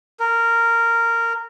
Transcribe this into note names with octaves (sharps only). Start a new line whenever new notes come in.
A#4